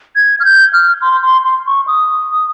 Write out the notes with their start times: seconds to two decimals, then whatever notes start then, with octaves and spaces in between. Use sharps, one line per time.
0.16 G#6
0.40 F6
0.45 G6
0.73 F6
1.02 C6
1.23 C6
1.44 C6
1.66 C#6
1.87 D#6